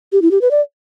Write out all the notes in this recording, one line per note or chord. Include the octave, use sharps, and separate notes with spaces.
G4
E4
G4
B4
D5